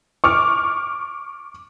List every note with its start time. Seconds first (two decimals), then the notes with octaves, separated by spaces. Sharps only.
0.24 C#6 D6 F6